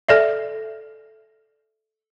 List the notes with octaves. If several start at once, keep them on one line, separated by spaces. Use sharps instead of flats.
A4 D5 E5